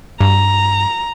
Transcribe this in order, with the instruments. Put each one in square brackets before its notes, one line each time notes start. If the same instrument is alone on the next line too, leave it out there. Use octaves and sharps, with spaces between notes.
[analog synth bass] G2 [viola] A#5